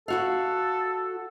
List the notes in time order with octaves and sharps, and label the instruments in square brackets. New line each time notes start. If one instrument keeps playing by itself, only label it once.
[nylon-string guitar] E4 F#4 F5 [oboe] A4